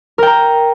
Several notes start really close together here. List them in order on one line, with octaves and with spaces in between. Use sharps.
A#4 G5 A#5